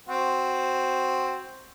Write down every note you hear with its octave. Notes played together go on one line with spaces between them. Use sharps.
C4 F#4